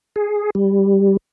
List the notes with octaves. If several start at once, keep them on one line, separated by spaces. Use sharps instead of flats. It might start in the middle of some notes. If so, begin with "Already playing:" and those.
G#4
G3